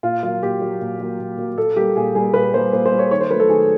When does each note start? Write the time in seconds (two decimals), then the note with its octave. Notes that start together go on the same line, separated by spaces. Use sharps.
0.03 A#2 F4
0.23 F#3 A#3 F4
0.42 A#2 G4
0.61 F#3 A#3
0.81 A#2
0.99 F#3 A#3
1.19 A#2
1.38 F#3 A#3
1.57 A#2 A4
1.76 G3 A#3 G4
1.96 A#2 G#4
2.15 G3 A#3 G#4
2.34 A#2 B4
2.53 G3 A#3 C5
2.73 A#2 C5
2.86 C5
2.92 G3 A#3
2.99 C#5
3.11 D#3 C#5
3.21 C5
3.30 F#3 B4
3.35 A3
3.40 A4
3.49 D#3 G#4